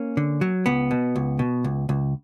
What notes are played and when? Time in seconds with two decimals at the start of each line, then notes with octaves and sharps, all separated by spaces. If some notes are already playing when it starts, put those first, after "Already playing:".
Already playing: A#3 C#4
0.17 D3
0.41 F#3
0.66 C#2 B3
0.91 B2
1.16 C#2
1.39 B2
1.64 C#2
1.89 C#2